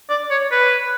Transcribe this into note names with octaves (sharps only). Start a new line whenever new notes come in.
D5
C#5
B4